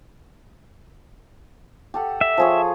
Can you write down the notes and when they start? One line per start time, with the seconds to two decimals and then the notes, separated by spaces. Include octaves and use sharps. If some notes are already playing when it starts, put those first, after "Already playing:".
1.94 G4 A4 F#5
2.21 E5
2.38 F3 G#4 C#5